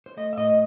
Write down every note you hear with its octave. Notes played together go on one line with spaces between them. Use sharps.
C5
A3 D#5
E5
A2 D#5